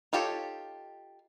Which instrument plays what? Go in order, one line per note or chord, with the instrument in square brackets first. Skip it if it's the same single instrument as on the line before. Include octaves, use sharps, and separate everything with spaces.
[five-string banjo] D#4 F4 G4 A4 C#5